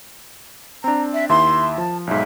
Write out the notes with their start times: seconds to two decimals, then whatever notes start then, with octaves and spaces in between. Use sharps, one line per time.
0.84 C4 D4 A#5
1.14 E5
1.29 D#2 E4 E5 C6
1.78 F3 A5
2.07 B1 G#2 E5